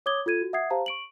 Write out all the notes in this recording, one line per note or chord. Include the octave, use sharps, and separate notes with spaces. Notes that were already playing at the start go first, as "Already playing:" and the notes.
C#5 D6 D#6 G#6 G7
F4 A4 G#6 D#7
F#4
E5 F#5 D#6 G#6 C7
G4 C5 F5 A5 A#5
C#6 D7 F#7